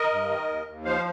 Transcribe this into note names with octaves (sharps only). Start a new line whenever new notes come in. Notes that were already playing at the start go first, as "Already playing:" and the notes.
Already playing: A#4 D#5
G2
D#3
D#2
D#2
F3 C5 F5